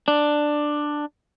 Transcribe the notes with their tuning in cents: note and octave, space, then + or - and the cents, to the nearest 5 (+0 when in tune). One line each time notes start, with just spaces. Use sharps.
D4 +10